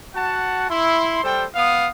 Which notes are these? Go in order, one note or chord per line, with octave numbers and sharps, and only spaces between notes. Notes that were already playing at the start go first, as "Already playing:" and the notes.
F#4 F#5 A5
E4 C6
G3 A4 C5 G5
B3 F5 D#6